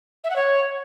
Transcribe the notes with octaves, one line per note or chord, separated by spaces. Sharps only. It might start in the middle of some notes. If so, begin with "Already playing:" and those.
E5
F#5
C#5